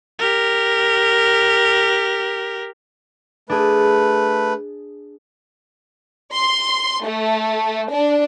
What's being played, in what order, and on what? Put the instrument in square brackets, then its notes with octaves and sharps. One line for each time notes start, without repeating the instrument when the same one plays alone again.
[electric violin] G4 A#4
[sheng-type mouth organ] A3 B4 [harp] D4 G#4
[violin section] C6
A3
D4